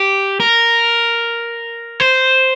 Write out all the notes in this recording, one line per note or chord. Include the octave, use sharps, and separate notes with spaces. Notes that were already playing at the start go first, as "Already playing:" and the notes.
Already playing: G4
A#4
C5